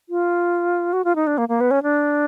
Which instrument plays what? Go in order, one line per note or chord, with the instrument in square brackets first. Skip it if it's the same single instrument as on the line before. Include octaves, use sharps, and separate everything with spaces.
[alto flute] F4
F#4
F4
D#4
D4
A#3
A#3
B3
C#4
D4